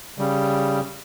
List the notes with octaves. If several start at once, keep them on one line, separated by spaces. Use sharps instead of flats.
C#3 G3